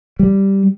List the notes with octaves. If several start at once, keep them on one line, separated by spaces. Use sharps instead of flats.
G3